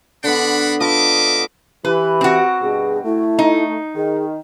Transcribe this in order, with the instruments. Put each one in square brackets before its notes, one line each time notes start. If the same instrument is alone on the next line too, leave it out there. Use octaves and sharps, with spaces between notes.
[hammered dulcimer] D3 B3 [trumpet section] D4 F#5 B5
[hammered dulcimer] B3 F4 A4 [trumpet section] D#5 E5 D6
[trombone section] E3 [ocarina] G4 [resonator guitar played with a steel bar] B4
[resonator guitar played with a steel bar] C4 F#4
[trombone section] G2 B2 [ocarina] G#4
[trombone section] A3 [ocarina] E4
[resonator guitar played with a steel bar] D#4
[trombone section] D#3 [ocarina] G#4